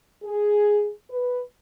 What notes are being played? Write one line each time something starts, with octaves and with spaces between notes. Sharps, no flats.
G#4
B4